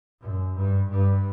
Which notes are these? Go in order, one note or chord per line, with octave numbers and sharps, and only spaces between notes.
F#2
G2
G2